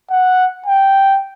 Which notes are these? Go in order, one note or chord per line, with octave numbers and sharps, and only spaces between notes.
F#5
G5